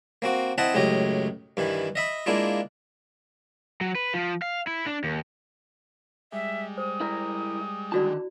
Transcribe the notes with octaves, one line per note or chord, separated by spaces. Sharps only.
A#3 C4 F#4
C4 E4 D#5 F#5 A5 B5
C#2 F#2 A2 G4 D#5
G2 D#3 E3
D#5 E5 B5
G#3 A#3 D4 E4 F4
F#3
B4
F3
F5
E4
D4
D#2
G3 G#3 E5
C5 D#6
E4 A#4
D3 D#3 E4 F#4 D5 A5